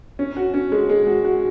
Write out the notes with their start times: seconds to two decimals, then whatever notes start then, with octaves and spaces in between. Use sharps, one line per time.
0.19 C#4
0.37 F#4
0.54 C#4
0.72 G#3
0.89 G#3
1.07 F#4
1.25 F#4